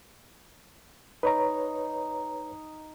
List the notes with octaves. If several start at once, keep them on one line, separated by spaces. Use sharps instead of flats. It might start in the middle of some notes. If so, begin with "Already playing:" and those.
D#4 B4 C#5 A#5